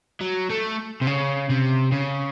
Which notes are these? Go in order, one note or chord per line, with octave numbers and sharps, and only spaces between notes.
F#3
A3
C3
C#3
C3
C#3